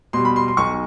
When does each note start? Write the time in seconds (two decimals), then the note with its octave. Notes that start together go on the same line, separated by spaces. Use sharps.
0.13 B2 G3 C6
0.25 B5
0.36 C6
0.48 C6
0.57 B1 C#6